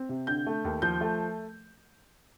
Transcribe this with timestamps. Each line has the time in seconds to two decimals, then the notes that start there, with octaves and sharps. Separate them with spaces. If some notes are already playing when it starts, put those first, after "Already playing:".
Already playing: C4
0.09 C3
0.27 D3 G6
0.46 A3
0.64 D#2
0.82 F3 G6
1.01 A3